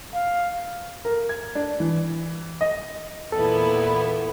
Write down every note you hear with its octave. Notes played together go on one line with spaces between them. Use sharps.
F5
A#4
G#6
D4
E3
D#5
E2 A#2 B3 E4 A4